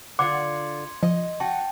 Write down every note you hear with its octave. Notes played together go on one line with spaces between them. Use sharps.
D3 F4 F#5 C6 D6 G#6 C#7
F3 D#5
F#4 G5 A5